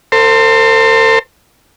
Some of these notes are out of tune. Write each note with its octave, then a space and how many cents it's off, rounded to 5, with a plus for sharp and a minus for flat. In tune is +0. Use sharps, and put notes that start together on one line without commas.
A4 +45 C5 +0